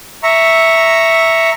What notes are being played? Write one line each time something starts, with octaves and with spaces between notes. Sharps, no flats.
E5 A#5 C#6